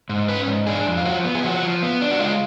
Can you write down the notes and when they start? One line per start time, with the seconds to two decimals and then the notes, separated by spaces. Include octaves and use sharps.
0.09 G#2
0.28 C#4 B4
0.48 G#2
0.67 D4 G#4
0.87 F2
0.97 F4
1.05 F3 F#4
1.25 B3
1.35 G#4
1.43 F3 F#4
1.63 F3
1.82 B3
2.01 D4
2.11 F#4
2.19 G#3 F4